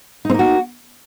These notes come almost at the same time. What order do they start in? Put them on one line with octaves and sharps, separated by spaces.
D#4 C4 A#3 F#4